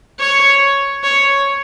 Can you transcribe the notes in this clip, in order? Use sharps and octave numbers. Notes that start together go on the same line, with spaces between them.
C#5
C#5